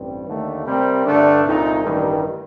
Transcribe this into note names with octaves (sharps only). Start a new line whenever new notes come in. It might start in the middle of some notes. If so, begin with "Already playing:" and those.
Already playing: A1 G2 G3 C4
D#2 D3 A3
C3 G3 C4 G4 A#4
G2 D3 A3 D4
C2 A#2 A3 D#4
A1 G2 D#3 G3